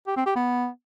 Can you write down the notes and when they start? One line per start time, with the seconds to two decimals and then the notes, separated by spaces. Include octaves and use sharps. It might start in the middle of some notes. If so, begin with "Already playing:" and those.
0.07 G4
0.16 C4
0.26 G4
0.35 B3